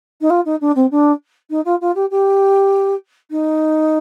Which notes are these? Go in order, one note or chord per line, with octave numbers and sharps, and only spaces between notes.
D#4
F4
D#4
D4
C4
D4
D#4
F4
F4
G4
G4
D#4